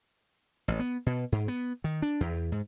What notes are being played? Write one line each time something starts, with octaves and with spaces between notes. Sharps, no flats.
A1
B3
B2
G#2
B3
D#3
D4
E2
G#2